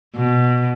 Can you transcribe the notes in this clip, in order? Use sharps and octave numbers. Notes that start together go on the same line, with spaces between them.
B2